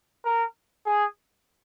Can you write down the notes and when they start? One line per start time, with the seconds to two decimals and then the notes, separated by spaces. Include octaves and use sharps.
0.25 A#4
0.86 G#4